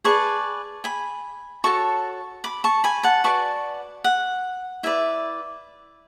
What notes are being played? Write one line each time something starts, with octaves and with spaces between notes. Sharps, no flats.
G#4 B4 D5 A5 C#6
G#5 B5
F#4 A4 C#5 A5 C#6
B5 D6
A5 C#6
G#5 B5
F#5 A5
F#4 B4 D5 A5 C#6
F#5
E4 B4 D5 E5